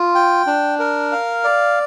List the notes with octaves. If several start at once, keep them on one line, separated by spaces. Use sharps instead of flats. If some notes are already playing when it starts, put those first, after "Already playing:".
Already playing: F4
G5
D4
A#4
F5
D5